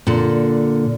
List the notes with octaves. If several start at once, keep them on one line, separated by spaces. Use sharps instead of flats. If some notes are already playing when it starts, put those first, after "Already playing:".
A#2 D3